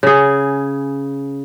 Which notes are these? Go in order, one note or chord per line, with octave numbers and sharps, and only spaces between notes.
C#3 G#4